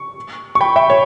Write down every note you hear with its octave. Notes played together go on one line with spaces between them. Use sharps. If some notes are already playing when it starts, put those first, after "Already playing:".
Already playing: C#6
C#6
G5 B5
E5 G5
C#5